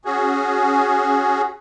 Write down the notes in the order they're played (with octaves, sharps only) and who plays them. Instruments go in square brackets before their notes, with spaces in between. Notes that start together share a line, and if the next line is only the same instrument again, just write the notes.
[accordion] C#4 F#4 G#4